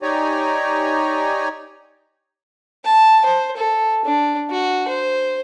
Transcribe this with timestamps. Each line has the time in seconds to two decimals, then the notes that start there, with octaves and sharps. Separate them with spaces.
0.02 D#4 G4 C#5 D5 G#5 A#5
2.85 A5
3.25 C5
3.57 A4
4.06 D4
4.50 F#4
4.88 C5